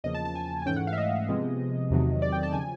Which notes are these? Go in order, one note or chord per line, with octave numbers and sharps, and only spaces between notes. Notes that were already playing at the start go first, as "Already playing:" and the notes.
E2 C#3 F3 A#3 D#5
A5
A5
G#5
G#5
G#2 E3 A3 C#4 G5
F#5
F5
E5
D#5
C3 F3 G#3 B3
E2 C3 D#3 F#3 A3
D5
G5
A5
C#3 F3 G#5